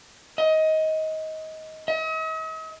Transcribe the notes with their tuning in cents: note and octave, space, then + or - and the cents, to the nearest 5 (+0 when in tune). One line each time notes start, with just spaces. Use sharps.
D#5 +20
D#5 +45